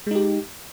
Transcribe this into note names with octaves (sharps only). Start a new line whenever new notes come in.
G#3 D#4 G4